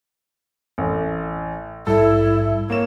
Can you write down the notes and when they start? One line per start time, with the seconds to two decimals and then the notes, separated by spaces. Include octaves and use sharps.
0.78 A1
1.87 A#1 G#2 G3 E4 A4
2.70 A#3 C#5 E7